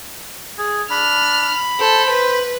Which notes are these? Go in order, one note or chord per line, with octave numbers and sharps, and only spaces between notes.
G#4
D4 B5 F6
A4 C5
B4